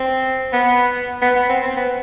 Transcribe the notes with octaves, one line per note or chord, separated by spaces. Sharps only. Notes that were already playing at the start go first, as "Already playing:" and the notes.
Already playing: C4
B3
B3
B3
C4
C4
B3